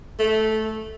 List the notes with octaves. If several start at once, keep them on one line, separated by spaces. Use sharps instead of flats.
A3